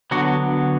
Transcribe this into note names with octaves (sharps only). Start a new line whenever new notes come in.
D3 F#3 B3 F#4